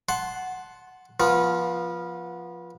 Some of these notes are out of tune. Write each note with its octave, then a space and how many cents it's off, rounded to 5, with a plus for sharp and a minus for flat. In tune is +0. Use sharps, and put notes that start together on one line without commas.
F#5 +0 A5 -20 C6 +0
F3 +0 B3 -20 F4 +0